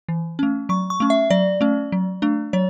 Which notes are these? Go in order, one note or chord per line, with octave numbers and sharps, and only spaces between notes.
E3
A3 C#4
F#3 C#6
C#6
A3 C#4
E5
F#3 D5
A3 C#4
F#3
A3 D4
F#3 C#5